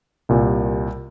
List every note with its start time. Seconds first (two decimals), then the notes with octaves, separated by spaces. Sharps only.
0.29 C2 A#2 G3